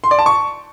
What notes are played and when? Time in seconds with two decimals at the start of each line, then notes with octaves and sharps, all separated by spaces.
0.04 C6
0.11 D5
0.19 A5
0.26 C#6